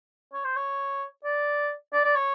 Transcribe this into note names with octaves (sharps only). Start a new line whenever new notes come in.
C#5
C5
C#5
D5
D5
D5
C#5